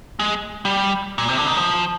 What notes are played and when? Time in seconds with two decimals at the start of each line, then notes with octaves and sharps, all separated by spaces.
0.20 G#3
0.65 G3
1.18 A#2
1.28 C3
1.38 D3
1.47 D#3
1.57 F3